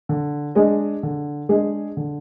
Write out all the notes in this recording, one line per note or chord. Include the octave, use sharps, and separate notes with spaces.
D3
G#3 D4 G#4 D#5
D3
G#3 D4 G#4 D#5
D3